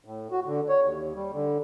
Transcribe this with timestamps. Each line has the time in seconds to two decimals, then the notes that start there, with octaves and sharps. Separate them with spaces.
0.05 A2
0.32 F#4
0.45 D3
0.69 C#5
0.81 D#2
1.14 G3
1.33 D3